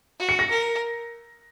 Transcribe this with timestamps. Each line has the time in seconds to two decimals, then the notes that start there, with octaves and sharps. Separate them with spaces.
0.19 F#4
0.29 C#7
0.39 A#6
0.50 A#4